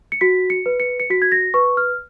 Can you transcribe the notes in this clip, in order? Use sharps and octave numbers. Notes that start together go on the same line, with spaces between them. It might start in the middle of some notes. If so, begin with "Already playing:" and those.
C#7
F#4 B6
C#7
B4
C#7
C#7
F#4 B6
G#6
A#6
B4 C#6
F6